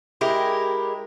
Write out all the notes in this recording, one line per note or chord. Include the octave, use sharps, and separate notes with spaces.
G#3 E4 G4 A#4